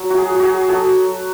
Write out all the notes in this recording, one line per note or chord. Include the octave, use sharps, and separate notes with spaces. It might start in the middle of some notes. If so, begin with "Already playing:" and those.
Already playing: F#3
F#4
G#4
F#3
F#4 G#4
F#3 F#4 A4